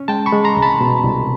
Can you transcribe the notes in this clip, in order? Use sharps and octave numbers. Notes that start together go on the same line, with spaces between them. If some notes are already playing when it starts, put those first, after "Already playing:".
Already playing: C#4
G#3 G5 A5
B5 C#6
G#3
A#5 C6
C2
A5 B5
B2
C2